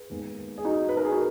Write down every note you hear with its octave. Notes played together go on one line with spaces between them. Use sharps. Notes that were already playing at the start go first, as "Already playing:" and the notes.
Already playing: G#4 B4
D#2 D#3 G#3 B3
G#4
D#4 F#4
B4
A#4
G#4
F#4